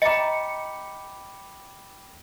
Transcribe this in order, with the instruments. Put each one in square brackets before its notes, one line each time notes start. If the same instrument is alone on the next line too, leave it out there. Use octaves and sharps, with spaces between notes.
[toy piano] D#5 A#5 [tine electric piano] G5 B5 D6 [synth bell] C#7